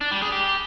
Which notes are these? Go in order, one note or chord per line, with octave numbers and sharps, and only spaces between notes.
D4
G3
G#4
G4